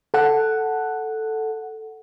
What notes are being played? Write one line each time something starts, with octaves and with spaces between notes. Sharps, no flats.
A4 F#5